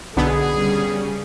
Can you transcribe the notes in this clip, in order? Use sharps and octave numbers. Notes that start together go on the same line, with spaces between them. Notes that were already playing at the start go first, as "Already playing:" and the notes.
B1 D3 B3 G#4
C#3 G3 C#4